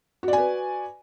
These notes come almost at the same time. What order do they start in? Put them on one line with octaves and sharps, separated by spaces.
F#4 D5 G#5 B4